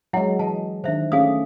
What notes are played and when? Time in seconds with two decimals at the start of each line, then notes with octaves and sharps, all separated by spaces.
0.13 F#3 G#3 E4 F#5
0.39 E3 D#5 A5
0.84 D#3 D4 C5 E5
1.12 A3 C#4 G#4 F5 D#6